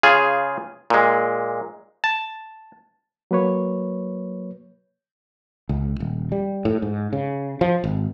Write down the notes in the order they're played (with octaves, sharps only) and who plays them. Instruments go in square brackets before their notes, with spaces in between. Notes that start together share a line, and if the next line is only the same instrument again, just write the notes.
[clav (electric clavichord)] C#3 F4 G#4
A#2 G#3
A5
[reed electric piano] F#3 A#3 B4 C#5
[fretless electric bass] C#2
D#1
G3
A2
G#2
C#3
F3
G#1